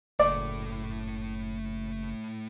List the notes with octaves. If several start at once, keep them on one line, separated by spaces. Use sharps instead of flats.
F#1 A2 A3 D5